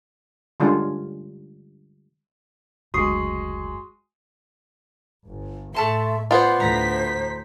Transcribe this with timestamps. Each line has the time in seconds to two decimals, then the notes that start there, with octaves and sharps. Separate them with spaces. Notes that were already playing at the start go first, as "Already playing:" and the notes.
0.60 D3 G3 G#3 C#4 D4 F4
2.94 F#1 D2 G#3 F#4 C#6 D#6 C7
5.28 G1
5.75 A2 A3 E5 A5 C6
6.31 B3 F4 C5 D5
6.60 D2 A2 A#5 B6